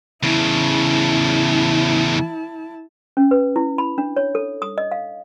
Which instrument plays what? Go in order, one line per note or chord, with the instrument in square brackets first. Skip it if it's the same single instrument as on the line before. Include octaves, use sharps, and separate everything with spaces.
[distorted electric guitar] E2 C#3 [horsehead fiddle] E4 A5
[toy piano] C#4
B4
E4
B5
D4
C#5
A4
D#6
D#5
F5